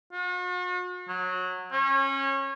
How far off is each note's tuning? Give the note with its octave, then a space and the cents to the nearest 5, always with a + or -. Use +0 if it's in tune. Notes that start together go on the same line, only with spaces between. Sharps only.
F#4 -45
F#3 -15
C#4 -25